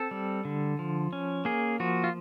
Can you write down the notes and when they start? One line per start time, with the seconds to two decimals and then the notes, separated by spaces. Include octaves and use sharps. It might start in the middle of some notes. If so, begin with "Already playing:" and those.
Already playing: C4 A4
0.11 G3
0.45 D3
0.79 F3
1.13 C#4
1.45 A#3 G#4
1.80 F3 F#4
2.04 F4